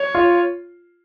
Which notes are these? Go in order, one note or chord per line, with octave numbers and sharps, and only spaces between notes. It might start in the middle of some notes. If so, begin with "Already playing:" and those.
Already playing: C#5
F4